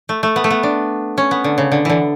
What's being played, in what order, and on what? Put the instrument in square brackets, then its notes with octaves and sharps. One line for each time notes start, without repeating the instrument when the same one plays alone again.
[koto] A3
A3
B3
A3
B3
D4
C#4
B3
D3
C#3
D3
D3 E3